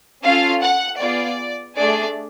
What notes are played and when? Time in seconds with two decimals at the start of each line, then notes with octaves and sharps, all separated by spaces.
0.24 C#4 F4 A4 F5
0.62 F#5
1.00 B3 F4 G#4 D5
1.75 A3 D4 G#4 D5